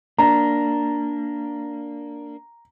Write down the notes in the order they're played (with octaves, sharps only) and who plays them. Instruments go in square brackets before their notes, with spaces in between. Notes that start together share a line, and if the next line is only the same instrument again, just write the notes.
[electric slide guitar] A#3 D4 [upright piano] A#5